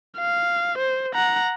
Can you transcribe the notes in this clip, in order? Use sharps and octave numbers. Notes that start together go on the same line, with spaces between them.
F5
C5
F#5 A#5